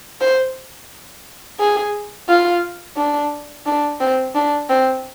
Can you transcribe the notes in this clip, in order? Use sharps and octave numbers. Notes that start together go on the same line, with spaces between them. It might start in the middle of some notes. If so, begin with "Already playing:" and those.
C5
G#4
F4
D4
D4
C4
D4
C4